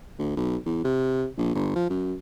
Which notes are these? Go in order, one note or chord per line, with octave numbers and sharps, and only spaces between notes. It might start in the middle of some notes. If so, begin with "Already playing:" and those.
D2
B1
E2
C3
A#1
G1
F3
F#2